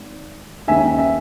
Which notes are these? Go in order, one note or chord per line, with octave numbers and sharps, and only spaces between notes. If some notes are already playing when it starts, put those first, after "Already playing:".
Already playing: G#1
D#2 D#3 G#3 C#4 E5 G#5
E5